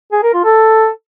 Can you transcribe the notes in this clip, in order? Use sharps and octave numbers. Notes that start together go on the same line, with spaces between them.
G#4
A#4
F4
A4